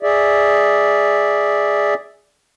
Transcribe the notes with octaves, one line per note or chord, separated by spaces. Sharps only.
G#4 D5 E5